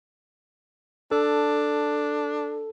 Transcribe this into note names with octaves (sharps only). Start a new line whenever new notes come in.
D4 A4